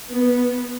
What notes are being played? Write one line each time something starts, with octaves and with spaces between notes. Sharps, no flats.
B3